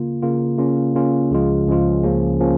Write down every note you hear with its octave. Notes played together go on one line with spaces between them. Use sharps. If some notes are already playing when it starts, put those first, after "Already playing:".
Already playing: C#3 A#3 F4
C#3 A#3 F4
C#3 A#3 C#4 F4
C#3 A#3 C#4 F4
C#2 C#3 F3 G#3 F4
C#2 C#3 F3 G#3 F4
C#2 C#3 F3 A#3 C#4
C#3 F3 A#3 C#4